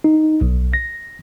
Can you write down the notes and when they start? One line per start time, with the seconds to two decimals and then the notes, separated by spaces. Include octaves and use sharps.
0.04 D#4
0.41 B1
0.73 A#6